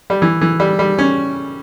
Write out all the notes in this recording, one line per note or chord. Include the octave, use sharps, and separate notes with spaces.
G3
E3
E3
G3
G3
C#4